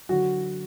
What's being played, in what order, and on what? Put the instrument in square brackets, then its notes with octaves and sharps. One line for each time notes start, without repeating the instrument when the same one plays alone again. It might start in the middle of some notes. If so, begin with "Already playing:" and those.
[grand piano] D3 F#3 F#4